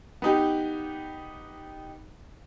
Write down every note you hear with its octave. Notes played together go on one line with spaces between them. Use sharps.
B3 D#4 G4